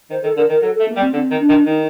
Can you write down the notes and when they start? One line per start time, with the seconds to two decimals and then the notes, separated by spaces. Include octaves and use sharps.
0.10 D#3 C5
0.23 D#3 A4
0.36 D3 A#4
0.49 D#3 A#4
0.62 F#3 A4
0.75 A4
0.80 A3
0.88 A#3
0.96 G3
1.01 C4
1.13 D3 C4
1.31 D#3
1.40 D4
1.49 D#3
1.66 D#3 D#4